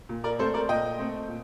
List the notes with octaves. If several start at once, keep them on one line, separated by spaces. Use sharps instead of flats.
A#2
A#4 D5
A3 C4 A4 C5
A#4 D5
A#2 D#5 G5
A3 C4
A#2